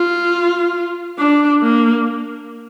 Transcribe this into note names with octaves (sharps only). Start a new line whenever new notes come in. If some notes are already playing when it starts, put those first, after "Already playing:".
Already playing: F4
D4
A#3